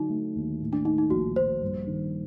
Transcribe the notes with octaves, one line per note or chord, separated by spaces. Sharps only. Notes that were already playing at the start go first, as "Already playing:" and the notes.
Already playing: D3 F#3 D#4
A3
D#2
A2
D4
A3 D#4
D#4
A#1 F#4
A#1 C5
G2
D#3